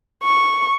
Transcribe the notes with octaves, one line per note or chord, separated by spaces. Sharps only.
C#6